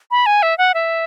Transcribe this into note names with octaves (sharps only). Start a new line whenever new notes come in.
B5
G#5
E5
F#5
E5